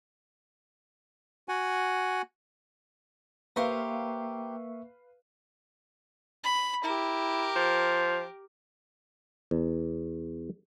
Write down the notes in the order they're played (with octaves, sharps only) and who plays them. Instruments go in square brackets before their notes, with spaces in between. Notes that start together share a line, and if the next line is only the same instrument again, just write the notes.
[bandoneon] F#4 F#5 G#5
[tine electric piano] A#3 E5 C#6 [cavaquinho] G4 C5 A#5 [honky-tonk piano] B4 F5
[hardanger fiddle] B5
[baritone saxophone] E4 [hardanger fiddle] G4 A#4
[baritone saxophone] F3
[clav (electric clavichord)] E2